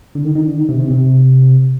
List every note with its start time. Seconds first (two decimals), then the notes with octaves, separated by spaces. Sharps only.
0.15 D3
0.24 D#3
0.35 D#3
0.47 D3
0.57 D#3
0.69 C3
0.80 C3
0.90 C3